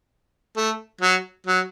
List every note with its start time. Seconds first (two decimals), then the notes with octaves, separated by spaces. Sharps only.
0.56 A3
1.01 F#3
1.47 F#3